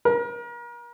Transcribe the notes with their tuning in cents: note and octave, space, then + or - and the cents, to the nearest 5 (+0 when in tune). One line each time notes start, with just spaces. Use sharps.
A#4 +40